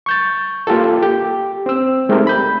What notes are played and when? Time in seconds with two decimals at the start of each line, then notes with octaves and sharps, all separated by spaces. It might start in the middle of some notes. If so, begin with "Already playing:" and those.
0.06 C#6 G6 A6
0.67 A#3 F4 G4 A4
1.02 G4
1.66 C4 E6
2.09 G#3 A3 C4 D#4 G4 A#4
2.27 B5 G6